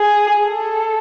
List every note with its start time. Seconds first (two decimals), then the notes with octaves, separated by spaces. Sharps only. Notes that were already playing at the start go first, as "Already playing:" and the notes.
Already playing: G#4
0.45 A4